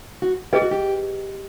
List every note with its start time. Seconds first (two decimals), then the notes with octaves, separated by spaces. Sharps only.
0.22 F#4
0.53 G4 G#4 B4 D#5
0.62 F#4
0.71 G4